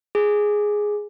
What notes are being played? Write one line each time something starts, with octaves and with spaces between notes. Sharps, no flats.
G#4